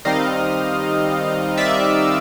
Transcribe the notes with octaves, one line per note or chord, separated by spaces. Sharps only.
D#3 G3 C4 D#4 D#5 F5
D5 E5